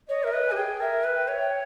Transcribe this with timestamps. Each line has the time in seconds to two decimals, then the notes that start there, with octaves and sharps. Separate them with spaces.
0.08 C#5 D#5
0.23 A#4 E5
0.32 B4 D#5
0.48 G#5
0.52 G4
0.56 G#4 G5
0.80 A#4 E5
1.04 B4
1.15 G5
1.28 C#5 E5
1.40 G5